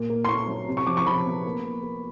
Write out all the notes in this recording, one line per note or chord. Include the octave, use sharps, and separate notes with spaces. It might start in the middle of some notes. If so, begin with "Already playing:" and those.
Already playing: A#2
A#3
C6
A#2 C#6
F#3
C3
C#6
F3 D6
C#6
F3 B5
B3
A#3
A#3
A#3